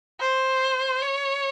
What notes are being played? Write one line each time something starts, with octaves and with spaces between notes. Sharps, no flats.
C5
C#5